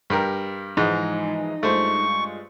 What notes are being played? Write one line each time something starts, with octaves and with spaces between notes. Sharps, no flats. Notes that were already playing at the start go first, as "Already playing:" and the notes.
G2 G4 A#4
G#2 E3 F3 G#3 D#4
G2 G#3 A3 F4 C5 C#6